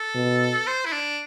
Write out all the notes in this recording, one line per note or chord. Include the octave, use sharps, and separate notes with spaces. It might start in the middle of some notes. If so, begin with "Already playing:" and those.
Already playing: A4
B2
C5
E4
D4